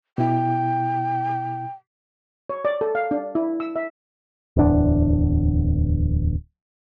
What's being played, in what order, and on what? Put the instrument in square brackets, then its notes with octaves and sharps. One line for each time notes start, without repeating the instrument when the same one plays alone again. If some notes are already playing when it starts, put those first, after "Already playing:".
[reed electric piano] B2 E4 [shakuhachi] G5
[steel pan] C#5
D5
A4
F5
D4
E4
E6
E5
[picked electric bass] D1 E2 D4